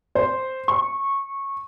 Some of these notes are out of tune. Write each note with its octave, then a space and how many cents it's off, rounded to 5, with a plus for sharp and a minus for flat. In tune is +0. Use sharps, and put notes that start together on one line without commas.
C5 +0
C#6 -15